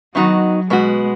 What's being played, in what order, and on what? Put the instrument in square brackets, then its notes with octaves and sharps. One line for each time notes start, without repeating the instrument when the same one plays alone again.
[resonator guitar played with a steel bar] D#3 B3 D#4 F#4 [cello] F#3
[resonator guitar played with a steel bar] B2 B3 F#4 [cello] G#3